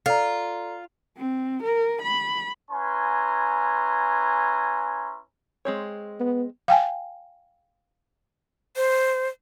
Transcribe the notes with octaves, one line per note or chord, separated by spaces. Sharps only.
F4 A4 D5 A#5
C4
A#4
B5
C#4 E4 B4 G#5 A#5 C6
G#3 C4 C#5
B3
F5 G5 G#5
C5